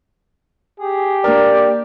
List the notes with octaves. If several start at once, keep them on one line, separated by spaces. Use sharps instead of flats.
G4 G#4
A#3 D4 A#4 D5